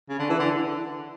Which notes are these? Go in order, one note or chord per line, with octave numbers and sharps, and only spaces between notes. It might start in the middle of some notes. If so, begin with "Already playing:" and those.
C#3
D3
E3
D3